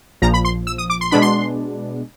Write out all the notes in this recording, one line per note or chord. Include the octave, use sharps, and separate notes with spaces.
A#1 A#2 F3 A#5
B5
C6
E6
D#6
D6
C6
B2 G#3 B3 D4 B5
C6